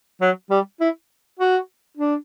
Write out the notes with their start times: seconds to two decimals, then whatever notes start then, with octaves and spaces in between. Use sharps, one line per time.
0.21 F#3
0.50 G3
0.80 E4
1.39 F#4
1.97 D4